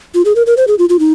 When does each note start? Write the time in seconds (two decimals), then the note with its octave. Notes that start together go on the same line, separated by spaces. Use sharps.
0.15 F4
0.25 G#4
0.36 A#4
0.47 A#4
0.57 C5
0.67 G#4
0.79 F4
0.89 F4
0.99 D#4